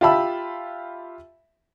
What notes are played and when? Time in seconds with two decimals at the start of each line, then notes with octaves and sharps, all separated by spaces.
0.01 F4 G4 E5 A5 B5 E6